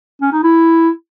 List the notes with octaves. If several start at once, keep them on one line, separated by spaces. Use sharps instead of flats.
C#4
D#4
E4